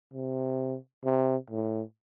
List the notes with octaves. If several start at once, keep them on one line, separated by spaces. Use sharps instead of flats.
C3
C3
A2